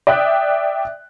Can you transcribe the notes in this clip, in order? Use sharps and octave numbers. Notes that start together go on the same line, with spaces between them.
D5 E5 G5 D#6 F#6